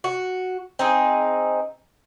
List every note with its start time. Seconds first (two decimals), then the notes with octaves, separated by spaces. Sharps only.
0.04 F#4
0.79 C4 D#4 G#4